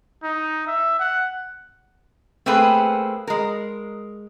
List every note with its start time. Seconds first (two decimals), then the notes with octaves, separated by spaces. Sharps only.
0.23 D#4
0.67 E5
0.99 F#5
2.46 A3 A#3 C4 G#4 B4
3.27 G#3 A#4